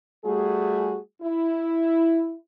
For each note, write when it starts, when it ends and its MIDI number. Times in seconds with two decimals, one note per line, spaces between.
0.25 0.98 55
0.25 0.98 57
0.25 0.98 66
0.25 0.98 68
1.22 2.37 64